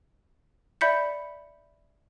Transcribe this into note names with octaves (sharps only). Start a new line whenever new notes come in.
D5 E5 B5 G6 B6 C#7